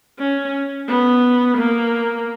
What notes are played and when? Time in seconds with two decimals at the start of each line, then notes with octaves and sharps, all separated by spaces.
0.19 C#4
0.88 B3
1.57 A#3